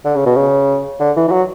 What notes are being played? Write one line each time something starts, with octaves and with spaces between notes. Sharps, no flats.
D3
C#3
B2
C#3
D3
E3
E3
F#3